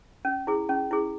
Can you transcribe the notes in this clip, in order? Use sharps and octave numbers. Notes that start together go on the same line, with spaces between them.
C#4
E4 G#4
C#4
E4 G#4